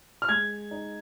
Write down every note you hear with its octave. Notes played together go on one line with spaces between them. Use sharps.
F6
G#3 G#6
D#4